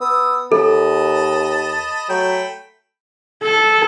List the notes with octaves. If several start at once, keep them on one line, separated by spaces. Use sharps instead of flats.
B3 D#6 E6
D#2 A4 D#5 A5 B5
F#3 A3 G5 B5
A4